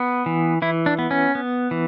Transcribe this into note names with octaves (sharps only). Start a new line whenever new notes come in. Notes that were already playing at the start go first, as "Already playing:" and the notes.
Already playing: B3
E3
E3 E4
D4
B3
C#4
B3
E3